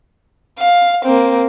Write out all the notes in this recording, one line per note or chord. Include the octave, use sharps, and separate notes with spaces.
F5
A#3 C4